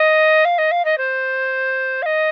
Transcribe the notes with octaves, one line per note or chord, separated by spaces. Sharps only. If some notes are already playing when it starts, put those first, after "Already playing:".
Already playing: D#5
F5
D#5
F5
D#5
C5
F5
D#5